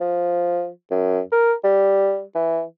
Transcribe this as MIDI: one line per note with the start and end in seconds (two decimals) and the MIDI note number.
0.01 0.68 53
0.91 1.20 42
1.32 1.53 70
1.64 2.22 55
2.35 2.63 52